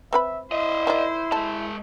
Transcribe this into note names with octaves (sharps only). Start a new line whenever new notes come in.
C4 B4 E5 B5
E4 C5 D#5 E5
D#3 D5
G#3 A4 A5